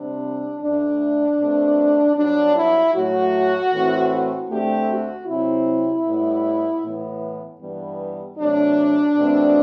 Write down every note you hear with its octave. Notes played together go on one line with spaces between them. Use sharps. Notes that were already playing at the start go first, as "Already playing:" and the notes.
Already playing: C3 G3 C4 D4
D2 D3 A3 D4
B2 A3 C4
G2 F#3 B3 D4
E4
A2 F#3 A3 F#4
A2 E3 A3 C4
D2 D3 A3 C4 G4
F#4
C3 F#3 C4 E4
A2 G3 B3
A2 E3 B3
G2 E3 G3 B3
C3 F#3 A3 D4
E2 B2 A3 C4